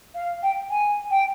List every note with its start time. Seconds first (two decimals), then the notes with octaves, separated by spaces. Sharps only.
0.15 F5
0.43 G5
0.70 G#5
1.11 G5